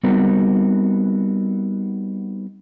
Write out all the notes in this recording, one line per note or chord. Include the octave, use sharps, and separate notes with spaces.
G3 B3 C4 D#4 F#4 A#4